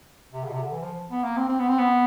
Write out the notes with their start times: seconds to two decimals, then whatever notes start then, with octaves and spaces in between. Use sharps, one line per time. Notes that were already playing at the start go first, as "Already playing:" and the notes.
0.33 C3
0.44 C#3
0.49 B2
0.53 C3
0.63 D3
0.73 E3
0.82 F3
1.11 B3
1.24 A#3
1.37 C4
1.49 C4
1.59 B3
1.69 C4
1.78 B3